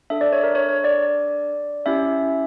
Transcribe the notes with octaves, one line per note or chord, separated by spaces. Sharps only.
D4 A4 E5
D5
C#5
A#4
C#5
C#5
D5
C#4 E4 G4 E5